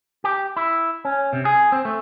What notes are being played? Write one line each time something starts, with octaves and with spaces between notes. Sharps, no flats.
G4
E4
C#4
C3
G#4
C4
A3